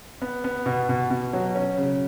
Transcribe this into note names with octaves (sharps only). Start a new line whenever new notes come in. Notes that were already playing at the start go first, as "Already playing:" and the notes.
B3
B3
B2
B2
B2
F#3
C#4
C#3